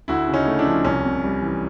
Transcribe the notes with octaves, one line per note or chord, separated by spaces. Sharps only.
D2 E4 F#4
C#3
C#4 D#4
A3
D4 E4
F3
C2 C#4
C3
G3
E3